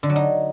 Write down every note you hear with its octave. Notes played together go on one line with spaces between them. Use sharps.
D3
F#3
D#4